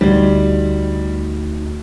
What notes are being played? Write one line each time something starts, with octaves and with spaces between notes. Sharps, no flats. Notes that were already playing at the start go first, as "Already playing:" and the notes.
D2 G3 A3 D#4 F#4